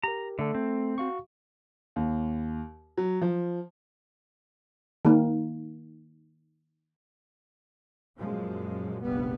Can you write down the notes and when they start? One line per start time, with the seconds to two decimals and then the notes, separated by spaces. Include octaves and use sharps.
0.03 G4 A#4 A#5
0.39 D3 A3 A4
0.55 C4
0.98 F#4 F5 C#6
1.96 D#2
2.97 F#3
3.21 F3
5.05 D#3 A#3
8.18 F#2 A#2 F3 G#3
9.03 F1 A#1 G2 G3 B3